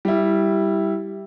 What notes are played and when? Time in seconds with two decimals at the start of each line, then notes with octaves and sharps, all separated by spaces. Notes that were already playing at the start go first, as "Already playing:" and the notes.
0.05 G3 E4